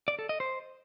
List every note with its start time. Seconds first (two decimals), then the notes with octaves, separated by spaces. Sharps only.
0.08 D5
0.19 A4
0.29 D#5
0.40 C5